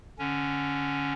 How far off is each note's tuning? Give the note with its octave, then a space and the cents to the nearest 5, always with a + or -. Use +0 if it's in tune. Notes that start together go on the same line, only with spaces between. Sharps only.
D3 +0 C#4 +0